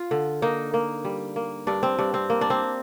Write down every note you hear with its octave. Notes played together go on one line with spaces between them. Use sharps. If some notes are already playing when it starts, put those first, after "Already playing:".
Already playing: F4
D3
A#3 D#4
A#3
G3
A#3
G2 D4
C4
G2 D4
C4
A#3
D4
C4